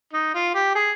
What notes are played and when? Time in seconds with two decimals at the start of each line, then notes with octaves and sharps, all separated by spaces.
0.13 D#4
0.34 F4
0.55 G4
0.75 G#4